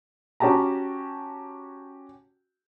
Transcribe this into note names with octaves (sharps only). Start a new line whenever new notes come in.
C#4 F#4 G4 A5 A#5